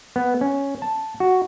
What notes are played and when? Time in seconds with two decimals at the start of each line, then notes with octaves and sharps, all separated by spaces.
0.16 B3
0.41 C#4
0.82 A5
1.20 F#4